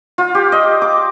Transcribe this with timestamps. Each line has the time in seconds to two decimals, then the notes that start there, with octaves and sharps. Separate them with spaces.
0.18 F4
0.35 G4
0.52 D#5
0.82 D6